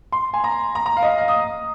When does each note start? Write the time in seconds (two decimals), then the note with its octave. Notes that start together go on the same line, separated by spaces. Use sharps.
0.12 C6
0.34 G#5
0.44 A#5
0.75 A#5
0.86 A#5
0.97 F5
1.03 D#5
1.07 F5
1.18 F5
1.28 D#6